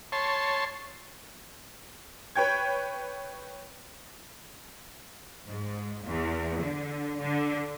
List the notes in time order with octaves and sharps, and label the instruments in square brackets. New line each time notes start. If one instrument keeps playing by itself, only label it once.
[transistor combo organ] C#5 A5 C6
[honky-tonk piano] B4 C#5 G5 G#6
[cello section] G#2
E2
D3
D3